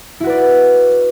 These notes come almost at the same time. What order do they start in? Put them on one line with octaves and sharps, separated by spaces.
E4 F#4 B4 D5